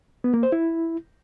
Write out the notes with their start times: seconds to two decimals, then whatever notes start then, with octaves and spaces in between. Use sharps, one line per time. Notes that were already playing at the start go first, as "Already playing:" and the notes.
0.24 B3
0.34 A#3
0.43 C5
0.52 E4